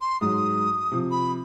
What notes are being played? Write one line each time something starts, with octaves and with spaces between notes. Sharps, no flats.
C6
G#2 F#3 D#6
C3 F3
B5